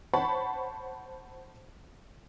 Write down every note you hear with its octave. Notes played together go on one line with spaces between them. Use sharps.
C5 C#5 F#5 A5 B5 C#6